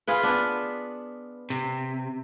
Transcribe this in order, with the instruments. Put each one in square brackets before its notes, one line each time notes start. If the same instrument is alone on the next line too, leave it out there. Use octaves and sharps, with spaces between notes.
[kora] F4 G#4 B4
B3 D4
[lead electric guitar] C3